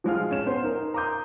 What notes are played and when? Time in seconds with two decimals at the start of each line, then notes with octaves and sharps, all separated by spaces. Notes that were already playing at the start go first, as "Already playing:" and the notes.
0.04 F3 G#3 F4 F6
0.31 C#4 E7
0.46 B3 C#4 C5
0.63 D#4 A#4
0.94 A#5 C6 D6 D#6 G6